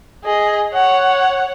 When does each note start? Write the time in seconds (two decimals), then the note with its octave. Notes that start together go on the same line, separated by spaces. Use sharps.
0.24 G#4 D#5
0.73 C#5 F#5